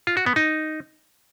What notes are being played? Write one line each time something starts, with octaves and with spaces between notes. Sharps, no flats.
F4
F#4
B3
D#4